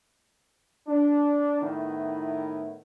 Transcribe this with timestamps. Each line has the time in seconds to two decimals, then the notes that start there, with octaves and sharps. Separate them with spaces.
0.87 D4
1.61 A2 D#3 B3 E4